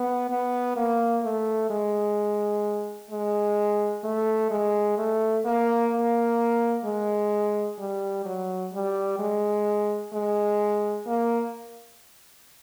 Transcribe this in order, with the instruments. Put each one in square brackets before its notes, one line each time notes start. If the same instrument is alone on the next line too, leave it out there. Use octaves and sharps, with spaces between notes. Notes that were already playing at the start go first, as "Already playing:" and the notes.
Already playing: [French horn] B3
B3
A#3
A3
G#3
G#3
A3
G#3
A3
A#3
A#3
G#3
G3
F#3
G3
G#3
G#3
A#3